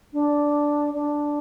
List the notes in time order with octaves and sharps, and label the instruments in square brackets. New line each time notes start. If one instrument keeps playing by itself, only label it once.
[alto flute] D4
D4